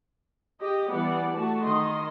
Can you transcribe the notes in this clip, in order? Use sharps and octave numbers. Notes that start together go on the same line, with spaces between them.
G4 D#5
E3 G3 B3 D5 F#5
A3 F#4 A5
D#3 D#5 C6